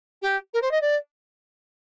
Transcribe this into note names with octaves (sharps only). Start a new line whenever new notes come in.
G4
A#4
C5
D#5
D5